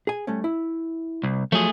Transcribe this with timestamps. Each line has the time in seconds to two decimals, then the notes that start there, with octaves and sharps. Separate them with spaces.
0.07 G#4 G#5
0.27 G3 A3 C#4
0.44 E4
1.23 C2
1.52 F3 F#3 A3 G#4